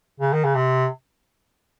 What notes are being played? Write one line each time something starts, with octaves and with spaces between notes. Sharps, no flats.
C#3
D#3
C#3
C3